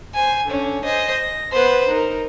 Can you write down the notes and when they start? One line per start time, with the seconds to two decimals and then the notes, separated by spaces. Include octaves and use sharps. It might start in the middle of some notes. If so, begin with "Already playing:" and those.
0.14 C5 G#5
0.46 D3 C#4
0.83 C5 D#5 G#5
1.14 A#6
1.52 B3 B4 C5
1.89 D#4 A#4